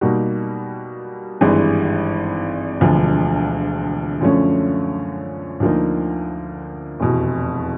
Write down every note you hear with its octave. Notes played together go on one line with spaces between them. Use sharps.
B2 G3 A#3 D#4 F#4
G#1 G2 E3 G#3
E1 D2 D3 F3
F#2 D3 F3 A3 C#4
D2 D3 F3 A#3 D#4
F1 E2 B2